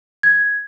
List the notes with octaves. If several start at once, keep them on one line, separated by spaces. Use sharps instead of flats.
G#6